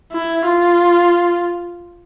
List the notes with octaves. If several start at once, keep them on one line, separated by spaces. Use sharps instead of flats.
E4
F4